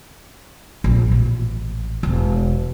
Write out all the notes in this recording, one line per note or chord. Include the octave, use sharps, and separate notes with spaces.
A#1
A1
E1